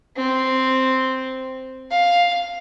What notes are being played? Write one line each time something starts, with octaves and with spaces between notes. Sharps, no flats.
C4
F5